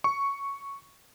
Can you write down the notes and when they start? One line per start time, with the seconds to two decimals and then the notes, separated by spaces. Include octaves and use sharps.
0.04 C#6